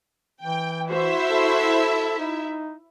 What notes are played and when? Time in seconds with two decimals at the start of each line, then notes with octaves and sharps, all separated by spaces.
0.43 E3 G5
0.89 E4 F#4 C5 E5
1.31 A4
2.19 D#4